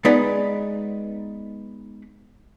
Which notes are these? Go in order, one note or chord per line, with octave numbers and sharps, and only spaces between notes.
G#3 B3 D#4 B4 D5 D#5